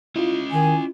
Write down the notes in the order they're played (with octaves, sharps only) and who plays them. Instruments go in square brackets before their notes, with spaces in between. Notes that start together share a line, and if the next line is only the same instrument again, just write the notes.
[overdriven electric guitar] C#4 D#5 [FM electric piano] E4 F4
[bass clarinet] D#3 [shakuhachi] G#5